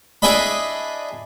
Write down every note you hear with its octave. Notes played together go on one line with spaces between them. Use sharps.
D4 E4 G#4 D5 D#5 B5